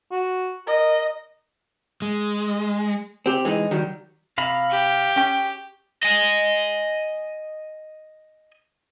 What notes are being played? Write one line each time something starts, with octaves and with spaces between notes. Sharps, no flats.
F#4
A#4 D#5
G#3
C4 G4
E3 G#3 D#4
D#3 F#3 G3
C3 F5 A#5 B5
G4
C#4 G5
D#5 G#5